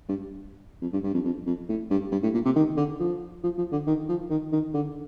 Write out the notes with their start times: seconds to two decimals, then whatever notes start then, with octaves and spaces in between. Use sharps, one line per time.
0.09 G2
0.82 F2
0.93 G2
1.03 G2
1.14 F2
1.25 F2
1.46 F2
1.69 A2
1.90 G2
2.12 G2
2.23 A2
2.34 A#2
2.45 C3
2.56 D#3
2.77 D3
3.00 F3
3.44 F3
3.58 F3
3.72 D3
3.87 D#3
4.09 F3
4.30 D#3
4.52 D#3
4.74 D3